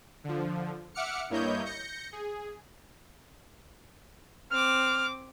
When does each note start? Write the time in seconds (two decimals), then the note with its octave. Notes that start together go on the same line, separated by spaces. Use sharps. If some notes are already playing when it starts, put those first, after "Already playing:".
0.24 D3 F3
0.95 E5 F#5 D6 F6 C#7
1.30 G2 A#3 E4 C#5 D#5 G6
1.65 G6 A#6 C#7
2.13 G#4
4.51 C4 D6 F6